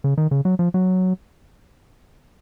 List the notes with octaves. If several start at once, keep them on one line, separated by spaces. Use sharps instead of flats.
C#3
D#3
C#3
F#3
F3
F#3